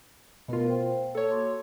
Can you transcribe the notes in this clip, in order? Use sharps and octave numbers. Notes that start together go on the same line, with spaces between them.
B2 A3 B3 F4 A#4
C5 F5 G5
A#3 A4 C#5
F#4 C6 D6